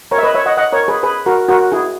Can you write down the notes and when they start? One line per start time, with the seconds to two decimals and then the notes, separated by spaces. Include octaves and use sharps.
0.11 A#4 C#5
0.18 E5
0.23 B4 D#5
0.34 C#5 E5
0.46 D#5 F#5
0.57 D#5 F#5
0.72 A#4 C#5
0.88 G#4 B4
1.03 G#4 B4
1.26 F#4 A#4
1.49 F#4 A#4
1.72 E4 G#4